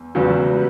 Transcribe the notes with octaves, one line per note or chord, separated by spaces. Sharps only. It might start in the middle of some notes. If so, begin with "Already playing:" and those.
Already playing: E2
E2 C#3 F#3 B3
G4 B4